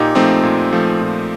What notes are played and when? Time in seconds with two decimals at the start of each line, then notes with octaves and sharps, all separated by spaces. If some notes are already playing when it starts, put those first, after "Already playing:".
Already playing: A#2 D#4 G4
0.15 F3 A3 C4 D#4
0.43 A#2
0.73 F3 A3
1.01 A#2